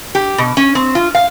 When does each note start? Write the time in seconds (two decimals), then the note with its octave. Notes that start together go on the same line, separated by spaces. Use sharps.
0.15 G4
0.38 B2
0.57 C#4
0.75 C4
0.95 F4
1.15 F5